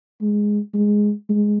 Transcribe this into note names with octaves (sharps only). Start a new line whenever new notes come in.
G#3
G#3
G#3